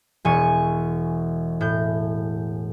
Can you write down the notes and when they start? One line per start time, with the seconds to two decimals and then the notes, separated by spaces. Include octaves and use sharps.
0.25 E1 G#5 C#6
1.61 A2 G6